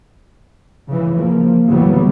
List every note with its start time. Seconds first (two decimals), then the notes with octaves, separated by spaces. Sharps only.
0.88 C#3 E3
1.17 F3 A#3
1.69 D2 C#3 E3 F#3 G3 B3